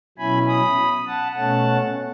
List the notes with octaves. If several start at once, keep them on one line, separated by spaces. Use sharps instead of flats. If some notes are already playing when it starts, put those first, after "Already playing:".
B2 F#3 C#4 E4 G#5 B5
B5 D#6
F#5 A5
B2 A3 C#4 F#5 A5